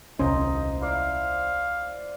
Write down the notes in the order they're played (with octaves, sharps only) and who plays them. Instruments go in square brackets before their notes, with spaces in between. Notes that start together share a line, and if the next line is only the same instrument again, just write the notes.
[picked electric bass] D#1 C2 C#4 [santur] D#4 F4 C5 [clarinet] D#5
[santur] E4 D5 E5 [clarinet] F5